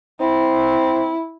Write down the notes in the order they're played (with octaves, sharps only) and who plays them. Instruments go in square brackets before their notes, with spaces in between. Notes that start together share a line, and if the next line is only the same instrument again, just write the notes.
[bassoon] C4 [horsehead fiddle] E4